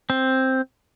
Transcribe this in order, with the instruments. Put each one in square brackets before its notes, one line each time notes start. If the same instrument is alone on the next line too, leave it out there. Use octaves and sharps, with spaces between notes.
[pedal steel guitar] C4